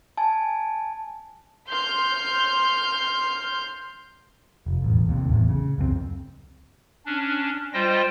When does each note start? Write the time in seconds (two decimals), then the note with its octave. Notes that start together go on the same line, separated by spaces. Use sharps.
0.17 G#5 A5
1.68 C6 F6 G6
4.66 F1
4.82 E1 A1
5.09 D#2 C3
5.29 A1 E2
5.49 C#3
5.78 C#2 F#2 A3 C4
7.06 C#4 D4
7.73 G3 F4 C5 D#5 G5 A#6